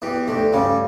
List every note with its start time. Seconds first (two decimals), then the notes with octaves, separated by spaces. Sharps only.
0.02 E2 E3 G4
0.28 D2 D3 G4
0.53 G2 C#3 G3